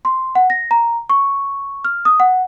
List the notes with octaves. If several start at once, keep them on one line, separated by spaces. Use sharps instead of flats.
C6
F#5
A#6
A#5
C#6
F6
D#6
F#5